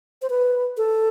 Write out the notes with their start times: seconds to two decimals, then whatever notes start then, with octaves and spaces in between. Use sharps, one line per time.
0.22 C5
0.30 B4
0.77 A4